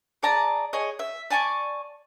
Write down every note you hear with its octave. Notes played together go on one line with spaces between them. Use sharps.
G#4 D5 A5 A#5
G#4 C#5 D#5
E5
D5 G#5 A5 C#6